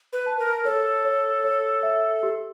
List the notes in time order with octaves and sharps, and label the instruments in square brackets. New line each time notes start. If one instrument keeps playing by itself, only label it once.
[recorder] B4
[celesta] A5
[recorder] A#4
[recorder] A4 [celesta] C#5
[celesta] C#5
C#5
E5
G4